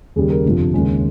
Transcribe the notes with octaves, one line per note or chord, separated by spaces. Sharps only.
D#2 C#3 G3 G#4
A#4
G1 F2 C3 F3
D#2 C#3 G#3